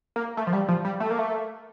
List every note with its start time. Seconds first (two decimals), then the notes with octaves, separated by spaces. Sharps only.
0.16 A#3
0.37 A3
0.47 F3
0.53 G3
0.68 F3
0.85 G3
1.00 A3
1.10 A#3
1.19 A3